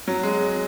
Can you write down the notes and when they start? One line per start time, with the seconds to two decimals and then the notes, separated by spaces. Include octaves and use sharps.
0.08 F#3
0.23 G#3